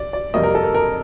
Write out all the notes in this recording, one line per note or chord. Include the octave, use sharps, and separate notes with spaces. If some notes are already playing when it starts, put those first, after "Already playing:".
Already playing: D5
D5
F2 C3 G3 A#3 D#5
A#4
A4
A#4
A#4